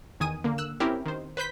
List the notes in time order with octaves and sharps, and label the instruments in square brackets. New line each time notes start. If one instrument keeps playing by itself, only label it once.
[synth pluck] E2 D#3 G#5 D#6 D#7
D3 A#3
E6 F#6
C4 C#4 E4 G4 A#4
D#3 C5
B4 C5 G6 B6